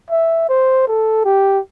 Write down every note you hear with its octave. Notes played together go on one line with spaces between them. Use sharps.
E5
C5
A4
G4